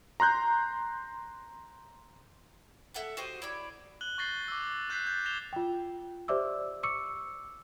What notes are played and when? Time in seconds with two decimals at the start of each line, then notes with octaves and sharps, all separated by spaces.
0.20 A#5 C6 F#6 G6
2.94 A4 E5 F#5 F#6
3.17 F#4 G4 C5 D#5
3.42 E4 C#5 D5
4.01 F#6 F#7 G7
4.18 C#6 G6 A6 A#6 C7 G7
4.48 D6 E6
4.90 F#6 G6 A6 B6 C7
5.07 G6
5.25 G#6 A#6 C7 E7 F7 G7
5.53 F4 G5
6.28 G4 C5 D5 E5 D6 E6
6.83 C#6 D6 E6 C#7